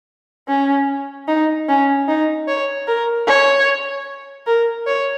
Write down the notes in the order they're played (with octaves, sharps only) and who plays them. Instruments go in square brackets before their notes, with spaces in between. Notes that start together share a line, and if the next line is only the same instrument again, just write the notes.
[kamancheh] C#4
D#4
C#4
D#4
C#5
A#4
C#5
A#4
C#5